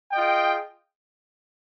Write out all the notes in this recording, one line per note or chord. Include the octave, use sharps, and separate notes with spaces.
F4 G#4 D#5 G5